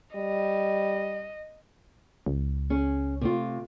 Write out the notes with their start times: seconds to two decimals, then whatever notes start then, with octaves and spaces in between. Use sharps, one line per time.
0.16 G3 D#5
2.26 C#2
2.70 C#4 G#4
3.21 C3 A3 F4